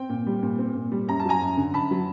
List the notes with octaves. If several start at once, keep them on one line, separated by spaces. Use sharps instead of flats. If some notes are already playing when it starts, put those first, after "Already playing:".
Already playing: C4 G5
A#2
G3
A#2
C4
A#2
G3
F#2 A#5
A5
F#3 G#5 A#5
F#2
D3
F#2 A5 B5
F#3